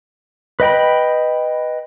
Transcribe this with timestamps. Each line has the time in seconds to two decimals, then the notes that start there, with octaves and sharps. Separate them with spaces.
0.60 B4 D#5 G5 B5